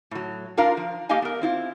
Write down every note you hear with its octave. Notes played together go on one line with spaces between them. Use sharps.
A2 F#3
D4 F4 A#4 F5 A#5
F3
A#3 G4 A4 D#5 F5 G#5
B3 A#4
C4 E4 F4